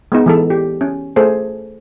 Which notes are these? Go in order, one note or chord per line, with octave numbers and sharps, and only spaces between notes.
G#3 B3 D#4
E3 G#3 A4
G4
C#4
A3 G#4 A4 C5